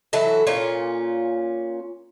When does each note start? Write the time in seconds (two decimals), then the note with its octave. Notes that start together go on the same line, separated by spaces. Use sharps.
0.13 E3 F#3 E4 A4
0.47 A#2 C#4 F4